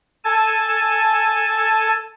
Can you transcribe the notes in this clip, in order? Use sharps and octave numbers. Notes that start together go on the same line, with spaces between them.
A4 G#5 A5